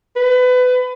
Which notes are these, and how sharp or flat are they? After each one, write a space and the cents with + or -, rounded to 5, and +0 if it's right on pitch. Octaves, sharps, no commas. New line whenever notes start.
B4 +25